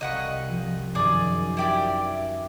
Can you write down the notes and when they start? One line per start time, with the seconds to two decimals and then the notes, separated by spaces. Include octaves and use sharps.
0.01 C2 D#5 F5 F#5 C#6 B6
0.50 F3
0.95 F#2 D#3 G#4 D5
1.57 E4 G4 D5